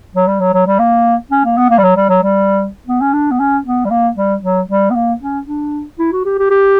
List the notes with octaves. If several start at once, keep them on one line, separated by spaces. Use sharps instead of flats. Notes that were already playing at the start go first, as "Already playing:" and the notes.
F#3
G3
F#3
F#3
G3
A#3
C#4
A#3
B3
A#3
G3
F#3
G3
F#3
G3
B3
C#4
D4
B3
C#4
B3
G3
A#3
G3
F#3
G3
B3
A#3
C#4
D4
E4
F#4
G4
G4
G4